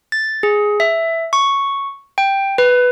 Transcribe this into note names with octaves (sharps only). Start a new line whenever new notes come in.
A6
G#4
E5
C#6
G5
B4